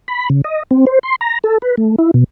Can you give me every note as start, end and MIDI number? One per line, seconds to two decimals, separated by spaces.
0.08 0.29 83
0.30 0.41 49
0.44 0.63 75
0.71 0.85 60
0.87 0.99 72
1.03 1.16 84
1.21 1.39 82
1.44 1.58 69
1.62 1.75 71
1.77 1.96 57
1.98 2.11 64
2.14 2.24 47